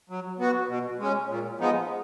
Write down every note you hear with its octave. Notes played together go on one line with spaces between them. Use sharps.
F#3
B3 F#4
B2
G#3 C#4
A#2
F3 G#3 B3 D#4